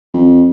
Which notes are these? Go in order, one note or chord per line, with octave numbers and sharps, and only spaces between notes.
F2